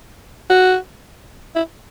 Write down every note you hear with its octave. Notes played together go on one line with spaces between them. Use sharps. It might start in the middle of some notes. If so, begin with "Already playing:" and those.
F#4
E4